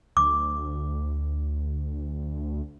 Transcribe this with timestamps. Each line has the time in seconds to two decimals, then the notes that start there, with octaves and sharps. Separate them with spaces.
0.17 D2 D6